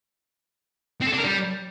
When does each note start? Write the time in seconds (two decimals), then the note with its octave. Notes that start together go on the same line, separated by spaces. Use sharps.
1.02 C4
1.07 A4
1.13 D4
1.18 A#4
1.24 G3